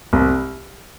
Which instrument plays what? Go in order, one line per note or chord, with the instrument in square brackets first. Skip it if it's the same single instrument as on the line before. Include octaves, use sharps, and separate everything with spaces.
[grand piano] C2